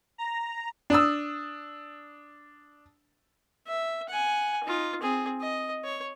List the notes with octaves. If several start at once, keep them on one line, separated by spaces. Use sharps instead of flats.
A#5
D4 D#6 E6
E5
F#5 G#5
D#4 F4
C4 G#4
D#5
C#5